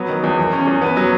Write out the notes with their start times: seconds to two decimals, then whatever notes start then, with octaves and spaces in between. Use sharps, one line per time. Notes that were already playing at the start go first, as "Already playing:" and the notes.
Already playing: F#3 B3
0.09 D#3
0.24 E2
0.38 E2
0.53 C#4
0.67 E2
0.81 B3
0.97 F#3